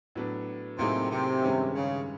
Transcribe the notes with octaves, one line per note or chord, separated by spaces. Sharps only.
A2 F#3 B3 D4
A2 C3 F#3 A#3 D#4 G#4
C3
G2 D#3 G#3 C#4
C#3